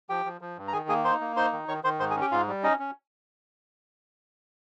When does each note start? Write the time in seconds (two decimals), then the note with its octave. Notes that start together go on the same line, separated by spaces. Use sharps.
0.09 F3 G4 G5
0.25 F3
0.41 F3
0.57 G2
0.68 A#5
0.73 D#3 G#4 G#5
0.89 A#3 G#4 G#5
1.05 D#4 C5 C6
1.21 A#3
1.36 D#4 C5 C6
1.52 D#3
1.68 D#3 C#5 C#6
1.84 D#3 C5 C6
2.00 G#2 C5 C6
2.10 G#4 G#5
2.16 C#4
2.21 G4 G5
2.32 G#2 F4 F5
2.48 G3
2.63 C#4 D#4 D#5
2.79 C#4